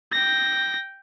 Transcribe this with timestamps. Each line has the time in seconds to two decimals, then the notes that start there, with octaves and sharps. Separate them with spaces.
0.12 G5 A#6